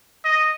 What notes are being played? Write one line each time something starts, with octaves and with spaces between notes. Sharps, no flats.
D#5